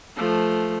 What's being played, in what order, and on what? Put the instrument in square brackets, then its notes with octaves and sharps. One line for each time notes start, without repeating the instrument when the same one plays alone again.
[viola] F3 A3